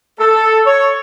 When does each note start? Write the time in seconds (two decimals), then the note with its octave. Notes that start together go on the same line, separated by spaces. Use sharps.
0.20 A4
0.67 C#5